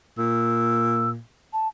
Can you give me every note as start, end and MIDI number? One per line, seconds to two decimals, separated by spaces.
0.18 1.19 46
0.18 1.10 88
1.53 1.68 81